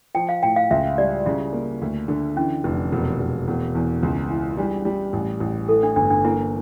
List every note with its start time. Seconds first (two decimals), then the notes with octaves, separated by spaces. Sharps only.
0.15 F3 G5
0.29 F5
0.43 A2 G5
0.56 F5
0.71 C#2 E5
0.98 G3 D5
1.26 C#3 E4
1.53 A#3
1.82 D2
2.08 D3
2.36 E3 C#4
2.64 F1
2.92 E1
3.20 E1
3.48 E1
3.75 E2
4.03 C#2
4.30 E3
4.57 G3 D4
4.85 G3
5.13 A1
5.40 A1
5.68 E3 A4
5.83 D4
5.96 G1 D4
6.10 D4
6.25 A#3 E4